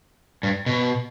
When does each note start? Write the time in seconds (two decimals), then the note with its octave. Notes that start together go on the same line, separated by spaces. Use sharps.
0.43 G2
0.66 B2